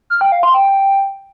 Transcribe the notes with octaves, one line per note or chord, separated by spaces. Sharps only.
F6
G5
F5
C6
G5